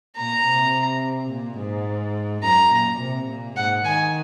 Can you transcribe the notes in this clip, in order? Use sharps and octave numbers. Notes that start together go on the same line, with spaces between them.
A#2 A#5
C3
A#2
G#2
F#2 A#5
A#2
C3
A#2
G#2 F#5
D#3 G#5